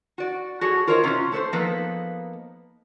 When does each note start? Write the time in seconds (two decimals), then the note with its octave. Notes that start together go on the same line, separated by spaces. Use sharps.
0.18 F#4 D5
0.61 F#4 G#4 A4 C#5
0.87 F4 A#4 C5 C#5 D#5
1.03 C3 C#4 D#4 F4
1.32 A3 A4 B4 C5
1.53 F3 A#3 B3 D#4 A4 B4